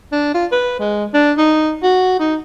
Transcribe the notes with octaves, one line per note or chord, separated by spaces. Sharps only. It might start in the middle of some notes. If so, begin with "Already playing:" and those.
D4
F4
B4
G#3
D4
D#4
F#4
D#4